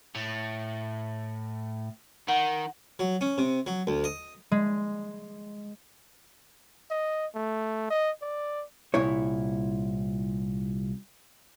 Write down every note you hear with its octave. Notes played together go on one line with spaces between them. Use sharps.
A2
D#3 F#5
F#3
C#4
C3
F#3
D2
D#5
G#3
D#5
A3
D#5
D5
C2 A#2 E4 C#5